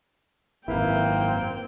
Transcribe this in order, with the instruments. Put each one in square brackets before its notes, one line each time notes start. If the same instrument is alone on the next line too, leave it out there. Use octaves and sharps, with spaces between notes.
[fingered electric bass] G#1 F#2 [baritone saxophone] A#3 [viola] C4 G5 [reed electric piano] E4 B4